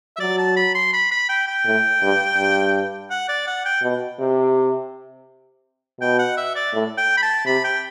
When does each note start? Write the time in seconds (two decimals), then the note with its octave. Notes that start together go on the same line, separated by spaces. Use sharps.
0.16 E5
0.20 F#3 D5
0.38 A5
0.56 B5
0.75 C6
0.93 B5
1.11 B5
1.29 G5
1.47 G5
1.66 A2
2.02 G2
2.37 G2
3.10 F#5
3.28 D5
3.47 F#5
3.65 G5
3.83 B2
4.20 C3
6.01 B2 G5
6.19 F#5
6.37 E5
6.55 D5
6.73 A2
6.98 G5
7.17 B5
7.22 A5
7.46 C3 B5
7.64 G5